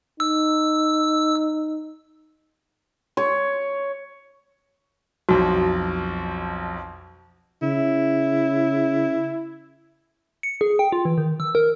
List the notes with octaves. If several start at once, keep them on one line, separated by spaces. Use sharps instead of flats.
D#4 E6
C#5
B1 F2 F#4
C#3 E4
C#7
G#4
G5
F4
E3
D#3
E6
A#4